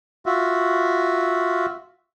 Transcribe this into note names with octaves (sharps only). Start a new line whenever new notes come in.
F4 F#4 E5